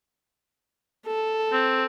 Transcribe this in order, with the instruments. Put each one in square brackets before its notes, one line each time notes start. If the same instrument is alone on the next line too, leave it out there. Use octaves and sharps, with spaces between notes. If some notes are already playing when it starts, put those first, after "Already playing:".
[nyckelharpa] A4
[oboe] C4